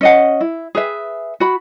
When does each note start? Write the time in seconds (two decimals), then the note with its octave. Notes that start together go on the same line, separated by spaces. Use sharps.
0.01 C#4 D#5 F#5
0.41 E4
0.75 G#4 B4 E5
1.40 F#4 B5